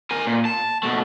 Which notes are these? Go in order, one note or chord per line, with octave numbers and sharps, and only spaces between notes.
A#4 G#5
A#2
A5
B2 A3